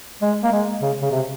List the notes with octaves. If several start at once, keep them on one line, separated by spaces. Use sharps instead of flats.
G#3
A#3
G#3
C#3
C#3
C3